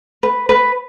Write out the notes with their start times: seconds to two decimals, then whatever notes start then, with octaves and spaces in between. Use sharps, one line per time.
0.23 B4
0.49 B4